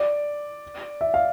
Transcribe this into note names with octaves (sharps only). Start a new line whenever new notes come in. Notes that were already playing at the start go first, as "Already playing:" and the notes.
Already playing: D5
E5
F5